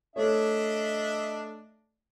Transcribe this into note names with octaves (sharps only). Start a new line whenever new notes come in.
A3 D4 C#5 D#5 E5